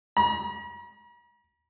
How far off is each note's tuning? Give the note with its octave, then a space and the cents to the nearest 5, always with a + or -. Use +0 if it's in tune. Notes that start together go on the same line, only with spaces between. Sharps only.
A#5 +45